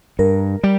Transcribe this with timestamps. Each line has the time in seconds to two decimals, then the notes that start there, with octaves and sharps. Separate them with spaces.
0.19 G2 A#4
0.63 G3